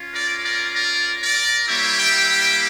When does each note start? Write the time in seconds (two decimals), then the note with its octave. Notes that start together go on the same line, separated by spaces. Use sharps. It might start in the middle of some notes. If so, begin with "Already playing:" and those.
Already playing: C#4 F4
0.14 A#4 D5
0.45 A#4 D5
0.76 A#4 D5
1.22 A#4 D5
1.68 G3 A#3 E4 G4 C#5 E5
1.99 E5 G5
2.30 E5 G5